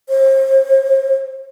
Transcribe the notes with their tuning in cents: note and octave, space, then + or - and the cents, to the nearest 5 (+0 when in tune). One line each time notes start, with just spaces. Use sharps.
C5 +40